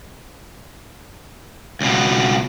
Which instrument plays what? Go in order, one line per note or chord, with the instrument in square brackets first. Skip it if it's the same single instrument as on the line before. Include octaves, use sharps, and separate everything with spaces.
[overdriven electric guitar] C#2 B2